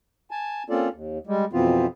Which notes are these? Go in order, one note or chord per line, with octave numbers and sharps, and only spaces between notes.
G#5 A5
A#3 C4 C#4 F4 A4 D5
D#2
G3 G#3
F2 B2 E3 B3 C4 F4